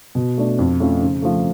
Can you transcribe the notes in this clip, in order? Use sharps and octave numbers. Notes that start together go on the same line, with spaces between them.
B2
A3 D4
F2
F3 A3 C#4
C#3
F3 A3